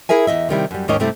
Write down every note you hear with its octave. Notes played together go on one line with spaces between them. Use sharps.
E4 G#4 A#4 E5 G#5
E2 F3 D#5 E5
C3 D#3 G3 E4
F#2 G3
D#2 G#2 A#3 C#4 C#5 D#5
G2 C3 G3 A3 E4